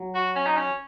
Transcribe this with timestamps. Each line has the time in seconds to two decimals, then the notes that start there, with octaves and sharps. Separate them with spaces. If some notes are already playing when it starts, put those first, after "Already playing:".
Already playing: F#3
0.15 F#4
0.36 C#4
0.47 D#4
0.57 C#4